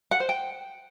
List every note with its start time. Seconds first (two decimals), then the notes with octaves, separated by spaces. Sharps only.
0.11 F#5
0.20 C5
0.29 G5